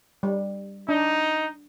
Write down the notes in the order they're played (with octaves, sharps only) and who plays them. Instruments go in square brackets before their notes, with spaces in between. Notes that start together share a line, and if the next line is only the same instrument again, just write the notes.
[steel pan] G3
[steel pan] D4 [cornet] D#4